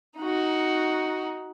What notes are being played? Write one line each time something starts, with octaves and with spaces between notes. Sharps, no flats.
D#4 F#4